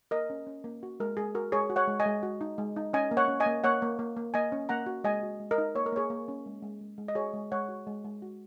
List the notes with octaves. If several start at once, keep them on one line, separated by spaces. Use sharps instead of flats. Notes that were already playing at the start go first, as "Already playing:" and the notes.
A#3 A#4 D#5
C#4
C#4
A#3
F#4
G#3 A#4
G#3 G#4
F#4 A#4
G#3 G#4 C#5
F#4
C#5 F#5
G#3
D#5 G#5
G#3
F#4
D#4
G#3
D#4
C#4 D#5 G#5
A#3
C#5 F#5
C#4
D#5 G#5
A#3
A#3 C#5 F#5
A#3
A#3
A#3
A#3 D#5 G#5
C#4
A#3 F#5 A#5
F#4
G#3 D#5 G#5
F#4
G#3
A#4 D#5
D#4
A#3 C#5
A#4
A#3 G#4 C#5
A#3
C#4
G#3
G#3
G#3
G#3
D#5
F#4 G#4 C#5
G#3
G#3 C#5 F#5
F#4
G#3
G#3
F#4